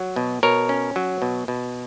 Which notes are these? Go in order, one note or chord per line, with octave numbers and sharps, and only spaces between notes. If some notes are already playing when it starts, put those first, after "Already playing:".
Already playing: F#3
B2
B2 A#4 C#5
C#4
F#3
B2
B2